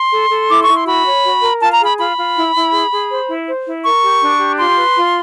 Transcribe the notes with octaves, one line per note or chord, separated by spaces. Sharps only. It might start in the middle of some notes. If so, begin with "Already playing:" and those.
Already playing: C6
A4
A4
E4 D6
C#6
E4
C6
F#4 B5
C#5
F#4
A#4
F4 A5
A#5
G#4
B5
F4 B5
F4
E4
E4
G#4
G#4
C5
E4
C5
E4
A#4 C#6
G4
D4
G4
F4 C6
B4
F4